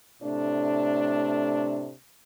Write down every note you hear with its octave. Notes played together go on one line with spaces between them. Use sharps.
A2 C3 A3 D4